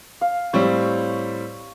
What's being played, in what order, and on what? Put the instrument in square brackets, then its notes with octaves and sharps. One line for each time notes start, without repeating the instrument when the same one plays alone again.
[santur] F5
[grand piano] A2 G3 C4 [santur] C#5